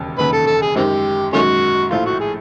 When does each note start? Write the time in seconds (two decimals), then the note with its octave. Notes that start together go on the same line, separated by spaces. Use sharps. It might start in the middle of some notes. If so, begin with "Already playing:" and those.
Already playing: E1 D#2 C#3
0.18 E1 D#2 C#3 B4
0.32 A4
0.46 A4
0.62 G#4
0.75 F#2 D#3 G#3 C4 G4
1.33 F#2 D#3 G#3 A3 C#4 F#4
1.91 A#1 A2 F3 A3 F4
2.05 F#4
2.20 G#4